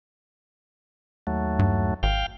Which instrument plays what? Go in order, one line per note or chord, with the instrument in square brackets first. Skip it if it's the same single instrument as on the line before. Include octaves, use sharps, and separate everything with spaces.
[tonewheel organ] D#2 F#3 A3
[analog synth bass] G2
[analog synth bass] G#1 [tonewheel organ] F5 G5